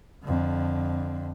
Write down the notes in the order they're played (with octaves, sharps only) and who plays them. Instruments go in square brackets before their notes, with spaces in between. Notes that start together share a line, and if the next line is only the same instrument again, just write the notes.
[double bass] F2 D3